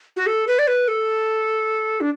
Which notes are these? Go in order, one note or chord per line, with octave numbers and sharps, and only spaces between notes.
F#4
A4
B4
D5
B4
A4
D4